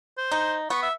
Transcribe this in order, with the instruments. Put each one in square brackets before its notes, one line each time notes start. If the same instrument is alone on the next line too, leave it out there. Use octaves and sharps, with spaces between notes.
[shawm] C5
[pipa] D#4
[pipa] B3 [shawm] C#6
[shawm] E5